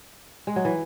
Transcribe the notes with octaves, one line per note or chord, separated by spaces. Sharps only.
G#3
F#3
E3